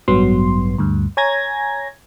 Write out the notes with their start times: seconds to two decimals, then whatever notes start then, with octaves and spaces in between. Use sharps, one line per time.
0.08 A1 G2 F#3 B3 C6
0.78 D2 G2
1.17 C#5 G#5 A#5 G#6 A#6